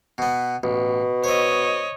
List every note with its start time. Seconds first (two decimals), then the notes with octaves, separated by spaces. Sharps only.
0.18 B2 B3
0.63 A1 B2
1.24 C5 C#5 D#5 E5